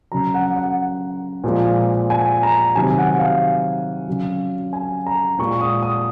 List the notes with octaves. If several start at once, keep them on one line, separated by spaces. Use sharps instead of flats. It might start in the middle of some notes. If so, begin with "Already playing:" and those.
C#3 F#3 A#5
F#5
F#5
A#2 F3 G#3
G#5
A#5
C3 D#3 F#3 G#5
F#5
F5
C#3 F#3
G#5
A#5
A#2 G#3 C#6
D#6
D#6